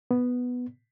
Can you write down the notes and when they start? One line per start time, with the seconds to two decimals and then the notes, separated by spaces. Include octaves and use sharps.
0.11 B3